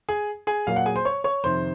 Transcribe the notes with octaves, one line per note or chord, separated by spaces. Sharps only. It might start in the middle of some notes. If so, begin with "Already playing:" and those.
G#4 G#5
G#4 G#5
A#2 F#3 A#3 F5
F#5
G#4 G#5
C5 C6
C#5 C#6
C#5 C#6
F2 C3 D#3 C5 C6